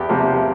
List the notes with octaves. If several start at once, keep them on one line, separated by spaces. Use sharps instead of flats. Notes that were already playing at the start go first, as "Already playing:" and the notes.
Already playing: E2 G4
C3 F3 A#3